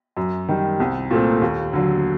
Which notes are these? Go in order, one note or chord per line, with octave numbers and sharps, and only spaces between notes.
F#2
D#3 G3
C2
A#2 A3 C4
D#2
D3 F#3